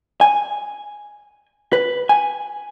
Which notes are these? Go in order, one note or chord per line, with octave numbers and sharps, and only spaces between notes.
G#5
B4
G#5